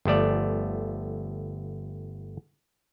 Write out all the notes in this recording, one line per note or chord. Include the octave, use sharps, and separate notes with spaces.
G1 F3 A3 D5